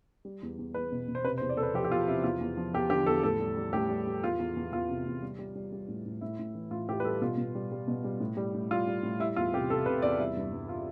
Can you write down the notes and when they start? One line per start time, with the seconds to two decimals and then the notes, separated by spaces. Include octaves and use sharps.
0.25 G3
0.42 E2
0.59 E2
0.74 E2 B4
0.92 B2
1.08 B2
1.15 C5
1.24 C3 B4
1.38 C5
1.41 E2
1.49 D5
1.57 E2 A4
1.63 B4
1.74 F3 G4
1.84 G4
1.91 E2 F4
2.07 C3 E4
2.24 E2 F4
2.40 E2
2.57 F3
2.74 E2 G4
2.90 D3 G4
3.06 E2 A4
3.23 A2 A4
3.40 G3
3.56 G3
3.73 A2 G4
3.89 G3
4.07 G3
4.24 E2 F4
4.39 E2
4.56 E2
4.72 E2 F4
4.89 C3
5.06 E2
5.22 G3
5.39 G3
5.55 G3
5.72 G3
5.88 A2
6.05 A2
6.21 A2 E4
6.39 A2
6.55 E3
6.71 A2 F4
6.88 A2 G4
7.00 B4
7.04 G3 A4
7.21 B2 F4
7.37 B2
7.55 G3
7.71 G3
7.87 B2
8.04 G3
8.20 A2
8.37 G3
8.54 A2
8.71 G3 F4
8.87 G3
9.03 A2
9.20 G3 E4
9.36 E2 F4
9.54 C3 G4
9.70 C3 A4
9.86 C3 B4
10.02 E2 D5
10.19 G3 E4
10.37 G2
10.53 G2
10.69 F4